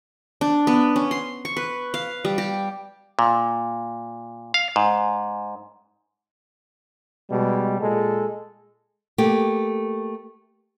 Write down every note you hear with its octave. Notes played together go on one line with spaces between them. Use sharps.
D4
B3
C#4
C6
C#6
B4
F5
G3
G4
A#2
F5
G#2
B2 G3 G#3
A#2 G#3 A4
A3 A#3 G4